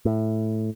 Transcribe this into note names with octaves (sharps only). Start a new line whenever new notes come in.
A2